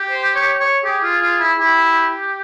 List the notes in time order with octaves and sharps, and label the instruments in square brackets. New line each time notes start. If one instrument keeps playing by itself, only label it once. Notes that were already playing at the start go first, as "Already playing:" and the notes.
Already playing: [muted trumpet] G4
[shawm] C5
C#5
C#5
[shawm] G4 [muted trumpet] G#4
[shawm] F4
F4
E4
[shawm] E4 [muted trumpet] G4